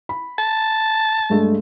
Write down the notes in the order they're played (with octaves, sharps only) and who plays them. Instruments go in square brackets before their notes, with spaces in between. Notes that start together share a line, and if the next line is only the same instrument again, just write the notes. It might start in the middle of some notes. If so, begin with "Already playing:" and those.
[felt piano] B5
[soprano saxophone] A5
[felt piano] G2 G#3 A3